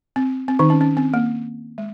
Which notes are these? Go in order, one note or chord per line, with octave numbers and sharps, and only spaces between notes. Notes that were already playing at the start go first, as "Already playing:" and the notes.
C4
C4
D#3 D#4
C#4
C#4
C4
A#3
G#3